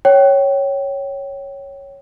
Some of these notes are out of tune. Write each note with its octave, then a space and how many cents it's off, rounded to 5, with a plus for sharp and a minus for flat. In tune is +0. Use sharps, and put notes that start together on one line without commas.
C#5 +0 G5 -20